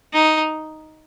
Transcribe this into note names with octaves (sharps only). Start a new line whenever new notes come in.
D#4